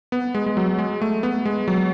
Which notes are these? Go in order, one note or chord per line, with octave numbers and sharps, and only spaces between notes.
B3
G#3
G#3
F#3
G#3
A3
B3
G#3
F#3